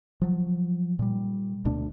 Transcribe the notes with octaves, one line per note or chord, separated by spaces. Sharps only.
F3 F#3
A#2 G3
D2 B2 A3 D4